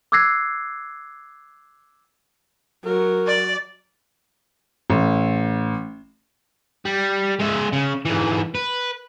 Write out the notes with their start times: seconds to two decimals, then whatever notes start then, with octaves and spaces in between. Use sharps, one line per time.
0.12 D6 E6 F#6 G#6 A#6 C7
2.85 F#3 A#4
3.27 D5
4.90 A1
6.85 G3
7.39 G#3 E5
7.72 C#3
8.06 G#2 E3
8.55 B4